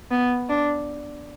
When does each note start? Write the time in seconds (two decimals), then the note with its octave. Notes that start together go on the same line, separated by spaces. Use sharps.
0.11 B3
0.49 D4